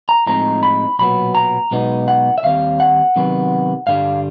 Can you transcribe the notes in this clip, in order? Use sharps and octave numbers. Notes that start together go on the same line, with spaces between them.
A#5
A2 F3 G#3 C4 D#4 A#5
B5
B1 A#2 F#3 B3 B5
A#5
B1 B2 G#3 B3 D#4
F#5
E5
D#2 D#3 G3 C4 F5
F#5
C3 D#3 F#3 B3
G2 D3 G3 F5